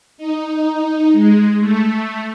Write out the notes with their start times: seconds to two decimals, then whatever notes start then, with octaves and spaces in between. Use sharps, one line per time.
0.18 D#4
1.12 G#3
1.60 A3